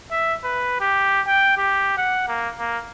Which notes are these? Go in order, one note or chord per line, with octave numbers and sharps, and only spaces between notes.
E5
B4
G4
G5
G4
F#5
A#3
A#3